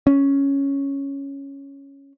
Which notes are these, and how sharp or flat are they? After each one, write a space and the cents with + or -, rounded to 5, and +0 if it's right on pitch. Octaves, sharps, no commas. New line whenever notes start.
C#4 +0